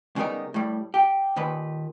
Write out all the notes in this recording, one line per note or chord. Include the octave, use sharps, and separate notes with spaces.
C#3 G3 B3 D#4 A#4
A2 G3
G4
D#2 A#2 D#3 B4